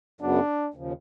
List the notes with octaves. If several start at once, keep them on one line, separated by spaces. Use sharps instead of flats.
F#2 C#3 F#3 B3 D4
D#2 C#3 F3